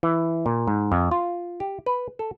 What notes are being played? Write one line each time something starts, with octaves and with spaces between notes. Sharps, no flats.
E3
A#2
G#2
F2
F4
G4
B4
A4